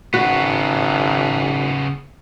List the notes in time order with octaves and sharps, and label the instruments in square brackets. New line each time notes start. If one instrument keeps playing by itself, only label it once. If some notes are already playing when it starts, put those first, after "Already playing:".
[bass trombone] G#1 [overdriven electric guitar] C#3 B3 [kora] F#4